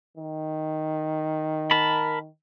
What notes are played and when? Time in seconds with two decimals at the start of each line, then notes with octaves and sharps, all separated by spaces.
0.17 D#3
1.71 A#4 A5 B5